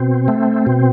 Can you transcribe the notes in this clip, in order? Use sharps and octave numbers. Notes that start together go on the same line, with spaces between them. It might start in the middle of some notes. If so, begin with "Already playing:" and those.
Already playing: B2 C4
A3
B2